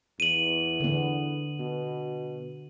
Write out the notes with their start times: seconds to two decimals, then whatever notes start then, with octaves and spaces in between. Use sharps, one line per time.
0.20 E2 D#7 F#7
0.80 D3 B3
1.59 B2